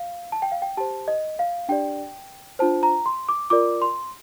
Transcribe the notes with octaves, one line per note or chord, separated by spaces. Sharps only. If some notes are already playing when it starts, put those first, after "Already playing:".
Already playing: F5
A5
G5
F5
G5
G4 C5 A5
D#5
F5
D4 G4 D5 G5
D4 F4 C5 A5
A#5
C6
D6
F4 A#4 D5 D6
C6